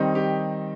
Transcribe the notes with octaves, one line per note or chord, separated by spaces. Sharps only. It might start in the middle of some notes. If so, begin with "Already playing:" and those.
Already playing: D#3 G3 C4 D#4
G4